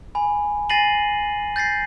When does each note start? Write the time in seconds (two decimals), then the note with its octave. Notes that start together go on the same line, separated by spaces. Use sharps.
0.15 G#5 B5
0.70 G#5 A6 A#6 C7 D#7 F#7
1.56 G6 A6 A#6 C7